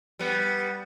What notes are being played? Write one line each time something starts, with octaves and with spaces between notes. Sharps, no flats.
G3 B3